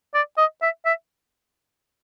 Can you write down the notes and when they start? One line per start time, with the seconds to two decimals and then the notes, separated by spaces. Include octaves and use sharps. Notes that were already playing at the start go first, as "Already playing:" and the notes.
0.14 D5
0.38 D#5
0.62 E5
0.85 E5